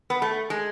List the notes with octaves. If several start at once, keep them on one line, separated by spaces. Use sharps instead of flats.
B3
A3
G#3